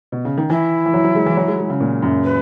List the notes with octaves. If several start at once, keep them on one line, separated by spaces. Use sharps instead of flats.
B2
C#3
D#3
E3 E4
E3
F#3
F#3
G#3
E3
F#3
G#3
G#3
C#3
A#2
F#2
B4